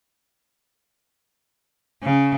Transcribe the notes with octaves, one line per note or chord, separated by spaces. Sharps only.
C#3